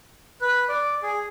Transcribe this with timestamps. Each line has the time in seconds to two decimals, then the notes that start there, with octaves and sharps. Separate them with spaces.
0.41 B4
0.69 D5
1.02 G#4